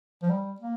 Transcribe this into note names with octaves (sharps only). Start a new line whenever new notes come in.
F3
G3
A#3